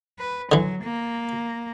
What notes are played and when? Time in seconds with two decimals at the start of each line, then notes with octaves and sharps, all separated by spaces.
0.19 B4
0.52 D3 E3 F#3
0.84 A#3